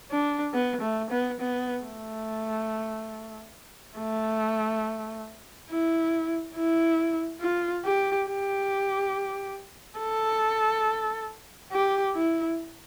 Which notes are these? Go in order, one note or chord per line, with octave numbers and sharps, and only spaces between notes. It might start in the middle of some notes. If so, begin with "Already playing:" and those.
D4
B3
A3
B3
B3
A3
A3
E4
E4
F4
G4
G4
A4
G4
E4